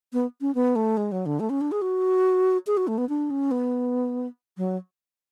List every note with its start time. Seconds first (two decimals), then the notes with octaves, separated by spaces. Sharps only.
0.13 B3
0.41 C#4
0.55 B3
0.76 A3
0.97 G#3
1.12 F#3
1.26 D3
1.40 A3
1.50 C#4
1.61 D4
1.72 G#4
1.82 F#4
2.67 G#4
2.77 F#4
2.87 A3
2.98 B3
3.09 D4
3.30 C#4
3.51 B3
4.57 F#3